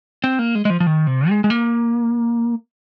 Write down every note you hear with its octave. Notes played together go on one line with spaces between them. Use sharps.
C4
A#3
G#3
G#3
F3
F3
D#3
C3
G#3
G#3
A#3